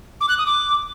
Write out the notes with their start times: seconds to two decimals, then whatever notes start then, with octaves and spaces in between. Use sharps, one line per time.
0.21 D6
0.29 F#6
0.38 D#6
0.46 D6